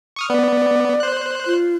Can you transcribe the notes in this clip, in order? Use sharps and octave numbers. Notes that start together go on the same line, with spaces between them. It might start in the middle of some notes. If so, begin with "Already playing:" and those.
C#6 D#6 F6
B3 D5
C5 F#6
F4